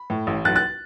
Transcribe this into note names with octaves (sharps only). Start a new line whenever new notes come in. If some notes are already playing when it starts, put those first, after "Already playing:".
Already playing: B5
A2
A1
B1 F#6 A6
F#6 A6